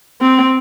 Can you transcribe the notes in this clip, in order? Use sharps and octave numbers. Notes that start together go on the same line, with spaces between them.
C4